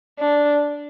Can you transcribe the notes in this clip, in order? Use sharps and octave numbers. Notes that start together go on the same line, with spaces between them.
D4